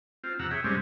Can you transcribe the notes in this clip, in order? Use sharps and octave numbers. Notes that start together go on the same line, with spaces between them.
C4 F4
F2 C3 F#5 A#5 E6
G#4 C#5 E5 G5
G2 C3 G3 G#3 C4 C#4